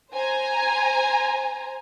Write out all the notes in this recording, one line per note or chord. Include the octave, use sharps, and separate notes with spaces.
C5 G#5 A#5